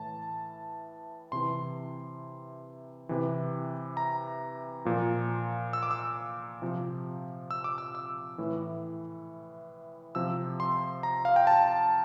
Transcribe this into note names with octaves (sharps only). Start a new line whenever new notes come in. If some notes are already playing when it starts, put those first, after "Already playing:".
Already playing: A2 E3 A5
C3 E3 C6
C3 E3
A#5
A#2 F3
E6
D6
E6
C3 F3
E6
D6
E6
E6
A2 E3
C3 F3 E6
C6
A#5
F5
G5
A5